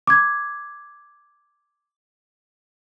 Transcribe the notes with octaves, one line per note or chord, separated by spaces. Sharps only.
D6 G#6